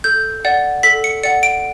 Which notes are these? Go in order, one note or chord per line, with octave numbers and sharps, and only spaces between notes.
A4 G6
D5 F#5
A4 B6
C#7
D5 F#5 C#7
D7